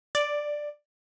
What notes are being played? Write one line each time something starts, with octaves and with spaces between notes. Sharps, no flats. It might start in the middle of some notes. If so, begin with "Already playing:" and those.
D5